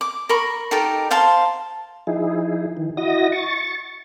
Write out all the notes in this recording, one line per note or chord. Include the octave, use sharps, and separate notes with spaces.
D6
A#4 B5 C#6
D#4 G4 A4 A#4
C5 F5 A5 C6
F3 D#4 E4 G#4
D#3 E3
E4 F#4 D#5 D#6 A#6
C#6 A6